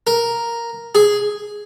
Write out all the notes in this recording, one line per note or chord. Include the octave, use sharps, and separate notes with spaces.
A#4
G#4